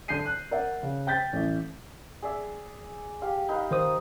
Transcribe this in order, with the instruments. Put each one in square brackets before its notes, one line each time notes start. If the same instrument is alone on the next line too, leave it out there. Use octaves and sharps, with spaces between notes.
[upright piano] D3 D4 G6 C7 D#7
F#6
A#4 D5 E5 F#5
C#3
G5 G6 A6 B6
A1
[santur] G#4 D5 E5
G4 F5
D#4 B4 F5
[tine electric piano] D#3 C5 D#6